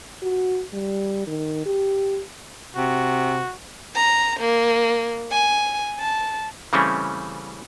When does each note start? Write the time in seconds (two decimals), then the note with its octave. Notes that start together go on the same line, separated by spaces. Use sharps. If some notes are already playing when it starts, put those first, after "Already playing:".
0.23 F#4
0.73 G3
1.27 D#3
1.66 G4
2.75 C3 F#4
3.96 A#5
4.40 A#3
5.31 G#5
5.99 A5
6.73 C#3 E3 G3 A3 C4 C#4